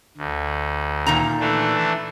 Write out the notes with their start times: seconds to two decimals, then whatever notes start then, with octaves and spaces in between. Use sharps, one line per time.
0.17 D2
1.06 A#2 D#3 A#5
1.40 E3 A3 D4